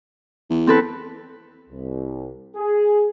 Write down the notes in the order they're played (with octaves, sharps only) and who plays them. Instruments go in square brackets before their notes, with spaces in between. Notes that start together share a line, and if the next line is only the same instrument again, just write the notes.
[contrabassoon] E2
[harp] C4 A4 B4
[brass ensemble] C2
G#4